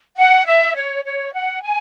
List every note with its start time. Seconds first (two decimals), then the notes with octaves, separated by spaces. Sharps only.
0.17 F#5
0.46 E5
0.76 C#5
1.05 C#5
1.33 F#5
1.62 G#5